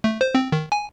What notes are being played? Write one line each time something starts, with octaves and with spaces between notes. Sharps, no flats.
A3
C5
C4
D#3
G#5